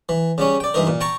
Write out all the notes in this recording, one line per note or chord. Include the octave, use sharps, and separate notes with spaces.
E3
C#3 G3 C#4
D5 G5
G2 E3 D#4 A#4
A#2
G5 A5 A#5 C#6